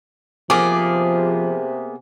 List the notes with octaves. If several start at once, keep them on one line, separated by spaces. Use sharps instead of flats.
C3 F3 A#3 B3 G#4 D6